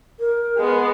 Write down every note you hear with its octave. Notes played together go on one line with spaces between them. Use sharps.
A#4
G#3 B3